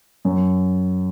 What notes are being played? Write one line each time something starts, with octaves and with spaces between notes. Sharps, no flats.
F#2